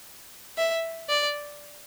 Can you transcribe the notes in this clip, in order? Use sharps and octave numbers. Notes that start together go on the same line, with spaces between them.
E5
D5